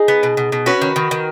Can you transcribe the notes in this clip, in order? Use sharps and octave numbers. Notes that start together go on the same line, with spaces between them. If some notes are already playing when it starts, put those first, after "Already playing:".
Already playing: D#4 G#4
B3
B2
B2
B2
C#4 F#4 B4
D#3
D#3
D#3